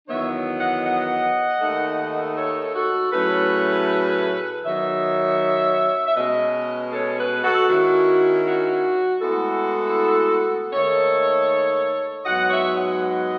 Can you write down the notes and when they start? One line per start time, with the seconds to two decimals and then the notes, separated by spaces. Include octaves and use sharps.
0.08 E2 D#3 F#3 B3 D#4 C#5 E5
0.59 D#5 F#5
0.84 D#5 F#5
1.61 D#2 D#3 A3 D#4
2.36 A4 C#5
2.74 F#4 A4
3.12 A2 F#3 A3 C#4 G#4 B4
4.65 D#3 F#3 B3 D#4 C#5 E5
6.07 E5
6.16 B2 G#3 C#4 B4 D#5
6.93 A4 C#5
7.18 G#4 B4
7.43 F#4 A4
7.69 D#3 G#3 C#4 E4 F#4
8.45 F#4
9.21 A2 G#3 B3 E4 F#4 A4
10.73 D#2 D#3 A3 A4 C#5
12.25 G#2 F#3 B3 D#5 F#5
12.50 C#5 E5
12.75 D#5 F#5
13.01 D#5 F#5